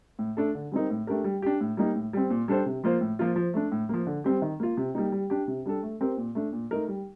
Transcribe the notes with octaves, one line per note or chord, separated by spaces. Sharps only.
A2
A3 D4 A4
D3
G3 C4 D#4 A#4
A2
A3 D4 G4 A#4
G3
D4 G4
A2
G3 A#3 D#4
A2
G3 C4
A#2
G3 D4 A4 C5
C3
F3 A#3 F4 C5
A2
F3 A#3 F4
F3
A3 D4
A2
F3 A#3
D3
G3 C4 G4
D#3
A#3 F4
C3
G3 A#3 D#4
G3
D4 G4
C3
G3 D4 A4
A3
C4 G4 A#4
A#2
A3 D4
A#2
A3 D#4 A#4
G3